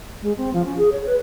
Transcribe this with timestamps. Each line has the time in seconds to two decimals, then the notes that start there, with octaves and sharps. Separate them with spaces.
0.22 G#3
0.38 C4
0.53 F3
0.65 C#4
0.77 G#4
0.92 C#5
1.06 B4